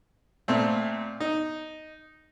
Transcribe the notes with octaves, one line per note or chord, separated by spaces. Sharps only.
A#2 A3 C4
D#4